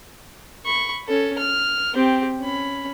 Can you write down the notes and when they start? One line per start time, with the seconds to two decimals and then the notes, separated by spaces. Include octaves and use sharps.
0.65 B5 C#6
1.08 C#4 A4
1.38 F6
1.94 C4 G4
2.40 C#4 B5